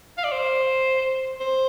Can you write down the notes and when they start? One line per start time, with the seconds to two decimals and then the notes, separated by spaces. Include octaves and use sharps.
0.18 F5
0.24 D5
0.32 C5
1.40 C5